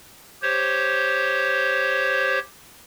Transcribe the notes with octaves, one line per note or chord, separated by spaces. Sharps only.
G4 C5 C#5